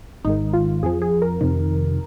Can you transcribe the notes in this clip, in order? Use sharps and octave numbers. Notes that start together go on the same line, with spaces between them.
G#1 G#2 D#3 D#4
F4
F2 F3 G#4
G#4
A#4
F2 C3 D#3